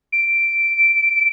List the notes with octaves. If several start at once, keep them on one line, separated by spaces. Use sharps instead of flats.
D7